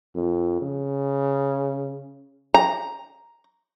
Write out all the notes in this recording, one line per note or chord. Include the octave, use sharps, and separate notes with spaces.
F2
C#3
A#5